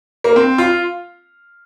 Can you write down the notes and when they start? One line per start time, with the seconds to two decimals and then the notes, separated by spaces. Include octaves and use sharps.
0.24 A#3
0.36 C4
0.58 F4